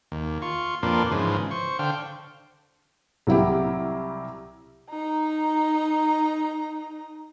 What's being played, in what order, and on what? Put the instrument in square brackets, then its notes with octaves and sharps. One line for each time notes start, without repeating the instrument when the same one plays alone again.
[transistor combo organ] D#2
F4 C#6
F2 A#2 A#3 D4 F4 B4
G#2 C#3 E3 F3
C5 C#6
D3 C5 F5 G5
[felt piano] C2 F#3 E4 G4
[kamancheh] D#4 A#5